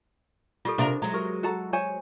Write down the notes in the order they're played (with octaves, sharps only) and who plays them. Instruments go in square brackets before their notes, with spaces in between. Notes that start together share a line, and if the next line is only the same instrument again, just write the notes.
[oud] G3 [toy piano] F4 G4 A4
[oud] C3 F4 A#4 [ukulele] D4 [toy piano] A4 E5
[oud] F#3 G#3 [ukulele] A#5
[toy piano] G4 [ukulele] A#4
[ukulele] F#4 A4 A#5
C5 C#5 G#5